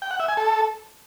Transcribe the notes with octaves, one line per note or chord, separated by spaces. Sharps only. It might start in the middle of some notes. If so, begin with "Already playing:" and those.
G5
F#5
E5
G#5
A4